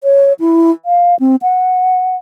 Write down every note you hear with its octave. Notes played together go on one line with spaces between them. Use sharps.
C#5
E4
F5
C4
F#5